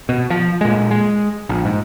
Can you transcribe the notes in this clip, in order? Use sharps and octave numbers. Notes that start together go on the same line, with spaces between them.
B2
F3
A#2 G#3
G#3
A#1
G#2